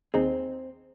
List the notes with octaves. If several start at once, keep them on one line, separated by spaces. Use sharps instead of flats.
D#2 C4 D#4 G#4